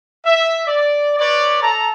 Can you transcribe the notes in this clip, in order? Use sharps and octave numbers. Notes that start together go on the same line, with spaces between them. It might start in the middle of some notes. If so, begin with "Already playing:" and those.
E5
D5
B4 C#5 D5
A4 A5 A#5